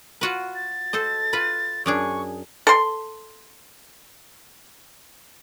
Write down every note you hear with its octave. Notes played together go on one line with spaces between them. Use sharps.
F4 F#4 B4
A6
A4 C5 D#5
F4 B4 B5
F#2 D4 G#4 C#6
A4 C6